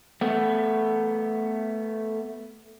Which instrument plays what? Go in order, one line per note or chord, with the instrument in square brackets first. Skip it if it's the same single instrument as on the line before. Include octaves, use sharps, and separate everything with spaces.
[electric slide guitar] A3 B3